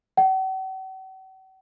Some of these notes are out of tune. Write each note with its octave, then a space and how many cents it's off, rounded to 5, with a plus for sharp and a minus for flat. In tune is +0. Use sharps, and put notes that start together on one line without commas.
F#5 +45